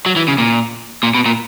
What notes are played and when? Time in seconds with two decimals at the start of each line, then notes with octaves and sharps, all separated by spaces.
0.06 F#3
0.16 E3
0.28 C#3
0.38 A#2
1.03 A#2
1.15 B2
1.26 A#2